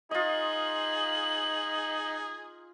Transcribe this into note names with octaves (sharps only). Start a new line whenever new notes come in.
D#4 F4 G#4 D#5 F#7